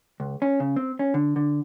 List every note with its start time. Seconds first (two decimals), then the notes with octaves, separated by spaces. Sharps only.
0.20 C#2
0.42 C#4
0.60 C#3
0.76 C4
0.99 C#4
1.14 D3
1.36 D3